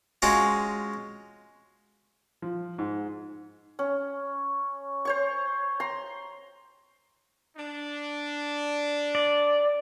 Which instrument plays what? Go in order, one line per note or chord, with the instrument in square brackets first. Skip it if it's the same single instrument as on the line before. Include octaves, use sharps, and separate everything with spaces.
[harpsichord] G#3 C#4 F4 F#4
[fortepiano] F3
G#2
[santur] C#4
C5 C#5 C#6
A#5 C6
[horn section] D4
[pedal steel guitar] D5